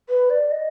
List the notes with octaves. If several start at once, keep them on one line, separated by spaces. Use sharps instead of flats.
B4
D5
D#5